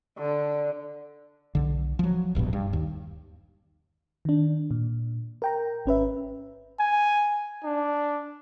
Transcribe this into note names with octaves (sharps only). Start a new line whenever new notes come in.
D3
B1 D3
F3 F#3
D1 A#1 G2 B2
G2
D#2
D#3 D4
A#2
A#4 G5 A#5
G#1 C#4 B4 E5
G#5
D4